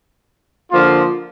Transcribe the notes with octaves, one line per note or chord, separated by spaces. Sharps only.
D3 F3 A#3 F4